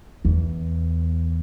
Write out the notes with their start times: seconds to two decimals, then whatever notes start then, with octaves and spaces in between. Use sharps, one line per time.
0.25 E2